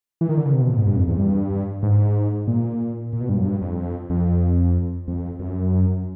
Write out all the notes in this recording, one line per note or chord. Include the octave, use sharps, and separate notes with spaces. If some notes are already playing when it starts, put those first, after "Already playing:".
E3
D#3
D3
C#3
C3
B2
A#2
G#2
G2
F2
E2
G2
G#2
A#2
A#2
B2
G2
F#2
G2
F2
F2
F2
F#2